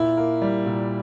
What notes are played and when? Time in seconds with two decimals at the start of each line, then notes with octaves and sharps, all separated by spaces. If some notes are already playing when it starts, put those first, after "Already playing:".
Already playing: A#2 E4
0.17 A#3
0.42 G3
0.66 A#2